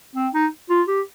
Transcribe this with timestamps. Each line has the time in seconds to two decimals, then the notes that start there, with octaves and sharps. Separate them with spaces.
0.15 C4
0.33 D#4
0.69 F4
0.88 G4